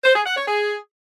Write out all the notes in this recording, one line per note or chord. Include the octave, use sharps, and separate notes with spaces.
C5
G#4
F#5
C#5
G#4